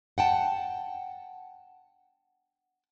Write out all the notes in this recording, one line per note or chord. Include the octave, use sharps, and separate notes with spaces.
F#5 G5 A5